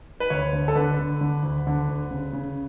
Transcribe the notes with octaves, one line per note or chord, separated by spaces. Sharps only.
B4
D2 C#5
D3
A4
D3 B4
D3
D3
D2
D3
D2
C#3
C#3